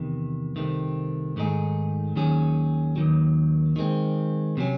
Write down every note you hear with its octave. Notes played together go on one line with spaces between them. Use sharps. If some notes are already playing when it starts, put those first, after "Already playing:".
Already playing: E2 C3 D#3
C2 C3 D#3 A3 C4
G#2 D#3 A3 D#4 G#4
D#2 D#3 F#3 C#4 G#4
D#2 D#3 F#3
D#3 G#3 C4
C3 D#3 F#3 C#4